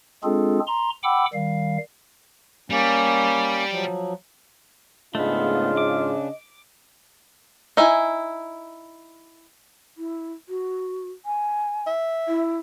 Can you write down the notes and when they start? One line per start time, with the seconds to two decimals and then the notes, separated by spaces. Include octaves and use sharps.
0.24 G#3 C4 D4 F4 G#4 A4
0.67 A#5 C6
1.03 F#5 G5 B5 D6 E6
1.34 D#3 G3 F5
2.70 G3 A#3 C#4
3.71 F3 F#3
5.15 G#2 C#3 A3 B3 C#4 D4 F4 D#5
5.77 D6
7.77 D#4 E4 G#5
9.97 E4
10.49 F#4
11.26 G#5
11.87 E5
12.28 E4